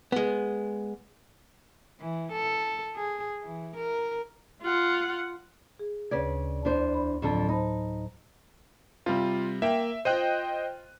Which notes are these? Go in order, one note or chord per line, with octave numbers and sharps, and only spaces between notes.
G#3 B3
E3
A4
G#4
E3
A#4
F4 F#5
G#4
D2 C#3 B4 D5 G#6
E2 D4 C5
B5
F2 A2 D3 F#3 A4
D#4 C5 A5 B5
C3 G3 F4
A#3 E5 G5
F4 C5 D#5 G5 F#6 D#7